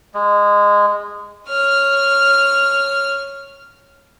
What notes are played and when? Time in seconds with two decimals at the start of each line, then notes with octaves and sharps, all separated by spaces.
0.14 G#3
1.48 C#5 F6